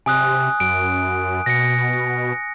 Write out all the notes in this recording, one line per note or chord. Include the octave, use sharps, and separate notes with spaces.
C3 G#5 D#6 F#6
F#2 D7
B2 A#6 C#7